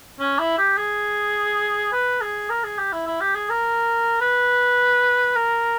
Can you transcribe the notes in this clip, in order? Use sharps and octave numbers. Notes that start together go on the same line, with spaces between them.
C#4
E4
G4
G#4
B4
G#4
A#4
G#4
G4
E4
E4
G4
G#4
A#4
B4
A#4